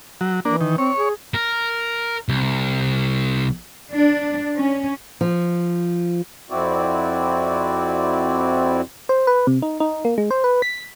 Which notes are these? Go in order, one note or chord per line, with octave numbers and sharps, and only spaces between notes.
F#3
E3 A#3 D4
D#3
C4 C#5
G#4
A#4
C2
D4
C#4
F3
F2 C4 E4 F#4 D5
C5
B4
C3
D#4
D#4
A#3
G#3
C5
B4
B6